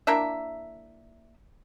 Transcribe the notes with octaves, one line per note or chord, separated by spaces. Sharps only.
A#3 D4 E4 E5